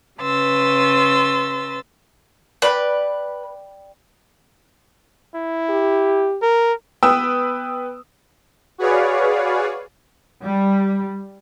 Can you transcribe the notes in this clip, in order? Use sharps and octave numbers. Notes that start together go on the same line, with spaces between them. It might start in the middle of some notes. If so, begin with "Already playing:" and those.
C#3 B4 C6 E6 A6
B4 D5 G5 B5
E4
G4
A#4
B3 B4 G5 D#6 E6
F#4 G#4 B4 C#5 D5 F5
G3